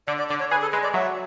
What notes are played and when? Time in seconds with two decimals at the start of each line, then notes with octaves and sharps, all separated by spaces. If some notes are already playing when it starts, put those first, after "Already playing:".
0.08 D3 D5
0.19 D5
0.30 D3 D5
0.40 C#5
0.51 G#4 B4
0.62 A4
0.73 G#3 B4
0.83 D5
0.94 F#3 E5